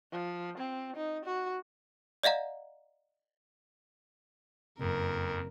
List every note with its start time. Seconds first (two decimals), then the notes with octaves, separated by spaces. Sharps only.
0.12 F3
0.58 C4
0.96 D#4
1.25 F#4
2.23 D5 D#5 F5 F#5 A#5
4.79 F#1 F2 A#4